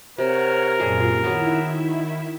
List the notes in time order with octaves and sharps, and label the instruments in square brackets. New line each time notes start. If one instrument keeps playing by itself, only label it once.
[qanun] C3 [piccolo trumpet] A#4 [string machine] C#5 F#5 F6
[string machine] F#2 A#2 F4 [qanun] G3 A3 G#4
[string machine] D#3 E4 E5 [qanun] B3 F#4 C#5